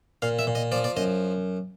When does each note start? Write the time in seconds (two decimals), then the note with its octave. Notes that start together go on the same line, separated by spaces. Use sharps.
0.22 A#2 F5
0.39 E5
0.47 A#2
0.55 D#5
0.72 F3 D5
0.84 D5
0.97 F#2 D#5